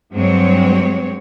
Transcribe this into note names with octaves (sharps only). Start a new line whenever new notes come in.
G2 F#3 G#3 C4 C#5